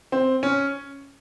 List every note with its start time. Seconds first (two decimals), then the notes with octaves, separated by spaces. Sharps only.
0.12 C4
0.43 C#4